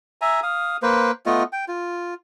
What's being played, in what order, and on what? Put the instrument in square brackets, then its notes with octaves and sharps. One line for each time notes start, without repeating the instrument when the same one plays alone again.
[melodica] E5 G#5 A#5
F5 D#6
A#3 B4 C5
A3 B3 F4 D#5
G5
F4